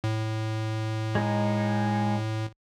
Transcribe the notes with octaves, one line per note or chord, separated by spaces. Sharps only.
A2
G#3 D#4